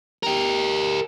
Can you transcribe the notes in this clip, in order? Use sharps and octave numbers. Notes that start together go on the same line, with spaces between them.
G4 A#4